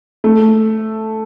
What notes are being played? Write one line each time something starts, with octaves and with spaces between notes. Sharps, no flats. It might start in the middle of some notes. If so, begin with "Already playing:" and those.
A3